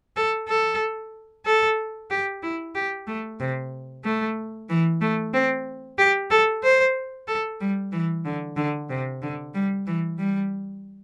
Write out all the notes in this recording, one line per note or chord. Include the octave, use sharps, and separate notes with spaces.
A4
A4
A4
G4
E4
G4
A3
C3
A3
E3
A3
C4
G4
A4
C5
A4
G3
E3
D3
D3
C3
D3
G3
E3
G3